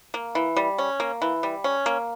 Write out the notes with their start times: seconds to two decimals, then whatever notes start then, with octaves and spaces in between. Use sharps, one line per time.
0.14 A#3
0.35 E3
0.57 G3
0.78 C#4
1.00 A#3
1.22 E3
1.43 G3
1.64 C#4
1.86 A#3